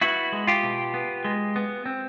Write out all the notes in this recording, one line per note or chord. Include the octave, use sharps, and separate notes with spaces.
B3 E4 F#4
G#3
F4 G4
B2
B3
G#3
B3
C4